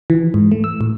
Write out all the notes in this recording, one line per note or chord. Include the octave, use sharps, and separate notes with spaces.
E3
G#2
A3
E6
A2